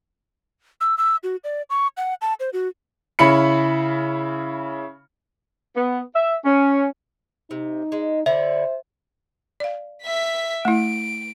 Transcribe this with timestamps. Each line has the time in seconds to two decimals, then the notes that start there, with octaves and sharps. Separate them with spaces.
0.81 E6
0.98 E6
1.23 F#4
1.44 D5
1.70 C#6
1.97 F#5
2.21 A5
2.40 C5
2.53 F#4
3.19 C#3 C#4 E4 B5 C#7
5.76 B3
6.15 E5
6.45 C#4
7.51 C3 D#4
7.92 G#3
8.26 D3 E4 C5 E5
9.60 D5 F5
10.03 E5 B6
10.65 A3 E4 D7